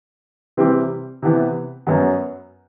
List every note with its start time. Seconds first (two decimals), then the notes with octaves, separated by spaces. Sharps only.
0.57 C3 E3 G3 C4 G4
1.22 C3 E3 B3
1.87 F#2 F#3 B3